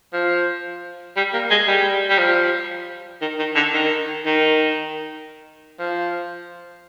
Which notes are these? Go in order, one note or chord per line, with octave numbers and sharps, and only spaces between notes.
F3
G3
A#3
G#3
G3
G3
F3
D#3
D#3
D3
D#3
D#3
F3